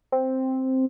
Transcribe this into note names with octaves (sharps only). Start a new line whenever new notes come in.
C4